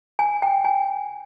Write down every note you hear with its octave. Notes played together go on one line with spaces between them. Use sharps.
G#5
G5
G#5